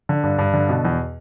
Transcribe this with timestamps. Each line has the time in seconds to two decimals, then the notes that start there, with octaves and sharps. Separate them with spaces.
0.09 D3
0.23 G2
0.38 G2
0.54 D3
0.69 B2
0.85 E2